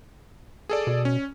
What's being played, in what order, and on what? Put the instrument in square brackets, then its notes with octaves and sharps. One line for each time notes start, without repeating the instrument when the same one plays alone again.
[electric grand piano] G#4 A4 D5
[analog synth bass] B2
[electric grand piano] C#4